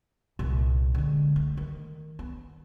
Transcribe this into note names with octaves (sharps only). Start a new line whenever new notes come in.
C2 A#2
D3 G#3
A3
D#3
B3